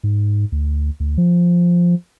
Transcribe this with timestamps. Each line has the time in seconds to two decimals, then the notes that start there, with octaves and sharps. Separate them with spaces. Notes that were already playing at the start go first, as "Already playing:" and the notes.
0.03 G#2
0.52 D2
1.00 D2
1.18 F3